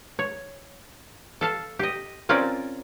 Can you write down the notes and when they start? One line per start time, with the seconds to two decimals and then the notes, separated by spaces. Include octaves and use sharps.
0.19 C#5
1.41 A4 F5 A5
1.79 G4 D#5
2.29 C4 C#4 F4 A#4 D5